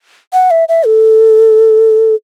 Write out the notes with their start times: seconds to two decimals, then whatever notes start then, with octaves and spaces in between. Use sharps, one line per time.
0.33 F#5
0.51 E5
0.69 E5
0.86 A4